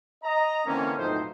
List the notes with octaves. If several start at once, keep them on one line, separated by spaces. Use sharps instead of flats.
D#5 A#5
D3 E3 A#3 C4 C#4
B1 F2 A2 F3 D#4 C5